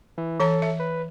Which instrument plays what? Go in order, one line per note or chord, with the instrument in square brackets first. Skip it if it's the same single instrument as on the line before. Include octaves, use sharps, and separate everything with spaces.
[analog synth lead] E3
[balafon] E3 C#5 A#5 [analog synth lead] A4
[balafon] E5
[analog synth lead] B4